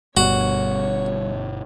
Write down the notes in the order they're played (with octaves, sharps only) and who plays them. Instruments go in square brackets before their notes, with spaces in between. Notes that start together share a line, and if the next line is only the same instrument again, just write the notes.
[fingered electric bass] G1 B2 [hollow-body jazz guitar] G2 [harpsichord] F#4 [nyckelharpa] C#5